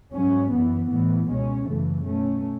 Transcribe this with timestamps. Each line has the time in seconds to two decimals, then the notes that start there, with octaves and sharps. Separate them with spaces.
0.13 G#2 F#3 C#4
0.52 F#2 E3 B3
0.90 A2 E3 B3
1.29 C#2 B2 G#3 C#4
1.66 F#2 C#3 E3 A3
2.05 B2 A3 C#4